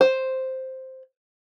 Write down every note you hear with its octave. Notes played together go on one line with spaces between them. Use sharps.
C5